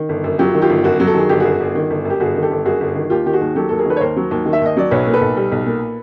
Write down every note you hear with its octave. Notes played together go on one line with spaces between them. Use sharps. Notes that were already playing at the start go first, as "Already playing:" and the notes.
Already playing: D#3
G1
F#2
F#3 F4 G4
D#3
F4 G4
G1
F#2 F#4
F#3
A4
D#3 G#4
G1 G4
F#2 F#4 G#4
G1
D#3
G1
F#2
G4
G1 F#4 G#4
D#3
G4 A4
G1
F#2 F#4 G#4
G1
D#3
D#2 F4 G4
D#3 G4
F#4 G#4
D#2
F#3 G4 A4
D#2 A4
G#4 A#4
D#3 A4 B4
C#5
D#2 A#4 C5
F#3
D#2
D#3
E5
D#2 D#5
F#3 D5
B1 B4 C#5
A#2
A4 B4
B1
G3
B1
A#2